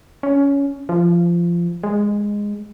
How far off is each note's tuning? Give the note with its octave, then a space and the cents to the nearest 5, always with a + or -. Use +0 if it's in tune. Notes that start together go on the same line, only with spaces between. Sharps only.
C#4 +15
F3 -20
G#3 -10